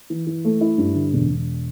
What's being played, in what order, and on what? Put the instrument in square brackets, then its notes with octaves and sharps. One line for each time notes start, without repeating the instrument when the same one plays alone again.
[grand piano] E3
E3
A3
E4
G2
D3
E1
E1